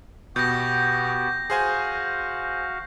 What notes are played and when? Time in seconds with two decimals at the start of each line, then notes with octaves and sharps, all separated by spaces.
0.36 B2 B3 F#4 G4 G6 A#6
1.50 F#4 G#4 C5 F5 G#5